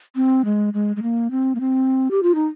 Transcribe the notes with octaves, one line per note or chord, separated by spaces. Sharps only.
C4
G#3
G#3
G#3
A#3
C4
A#3
C4
G4
F4
D#4